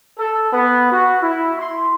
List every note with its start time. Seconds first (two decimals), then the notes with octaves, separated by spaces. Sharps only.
0.19 A4
0.52 B3
0.91 F#4
1.21 E4
1.59 C6